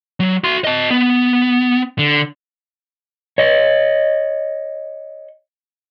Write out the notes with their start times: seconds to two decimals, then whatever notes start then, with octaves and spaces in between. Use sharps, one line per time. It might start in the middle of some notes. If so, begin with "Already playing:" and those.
0.20 F#3
0.44 F#4 C6
0.64 D#5 A5
0.90 B3
1.99 D3
3.38 C#5 D#5